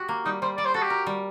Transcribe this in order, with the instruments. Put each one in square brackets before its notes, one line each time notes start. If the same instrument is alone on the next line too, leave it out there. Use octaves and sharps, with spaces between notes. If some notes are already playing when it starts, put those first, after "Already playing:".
Already playing: [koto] F#4 G4
A#3
[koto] G3 [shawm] D#4
[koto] G3 [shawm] C5
[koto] G3 [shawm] D5
[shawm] C5
[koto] F#4 [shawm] A4
[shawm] G4
[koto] A#4
G3